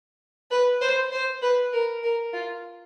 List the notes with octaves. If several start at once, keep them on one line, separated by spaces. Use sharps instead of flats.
B4
C5
C5
B4
A#4
A#4
F4